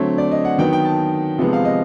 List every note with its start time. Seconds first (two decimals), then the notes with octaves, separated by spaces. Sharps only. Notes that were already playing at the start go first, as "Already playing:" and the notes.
Already playing: D3 F#3 A3 C4 C#5
0.18 D5
0.31 D#5
0.45 F#5
0.58 D#3 F#3 B3 G5
0.73 G5
0.85 A5
1.38 C3 F3 G#3 B3
1.53 F5
1.65 D#5